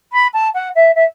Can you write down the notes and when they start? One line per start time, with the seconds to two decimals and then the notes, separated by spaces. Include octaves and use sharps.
0.12 B5
0.33 A5
0.54 F#5
0.75 E5
0.95 E5